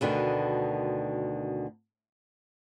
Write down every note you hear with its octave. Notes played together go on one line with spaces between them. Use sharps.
D2 B2 D3 D#3